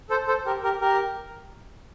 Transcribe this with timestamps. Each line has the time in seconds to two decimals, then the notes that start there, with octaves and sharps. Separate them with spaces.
0.10 A4 C5
0.27 A4 C5
0.46 G4 A#4
0.63 G4 A#4
0.81 G4 A#4